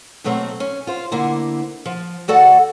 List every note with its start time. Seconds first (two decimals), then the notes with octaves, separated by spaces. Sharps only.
0.24 B2 F#3 A3 A#3 C4
0.60 C#4
0.87 F4 C5
1.11 D3 A#3 E4 C5
1.86 F3
2.28 D2 F#4 A4 D5 F#5